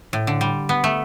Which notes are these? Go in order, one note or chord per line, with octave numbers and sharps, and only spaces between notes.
A2
D3
G3
B3
A3